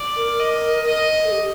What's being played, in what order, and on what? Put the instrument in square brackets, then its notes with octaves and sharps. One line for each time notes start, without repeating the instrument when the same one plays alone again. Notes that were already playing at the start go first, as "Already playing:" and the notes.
Already playing: [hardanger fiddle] D5
[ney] A#4
[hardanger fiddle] D#5
D#5
[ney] A4
G4